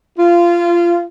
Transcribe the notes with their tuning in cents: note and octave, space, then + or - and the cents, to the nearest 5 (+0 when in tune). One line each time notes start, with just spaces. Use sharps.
F4 -20